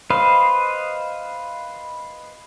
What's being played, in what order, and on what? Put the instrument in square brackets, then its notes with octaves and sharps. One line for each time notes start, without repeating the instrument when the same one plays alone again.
[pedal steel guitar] B4 C5 D#5 F5